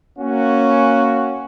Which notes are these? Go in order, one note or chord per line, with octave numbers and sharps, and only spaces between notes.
A#3 C#4 F#4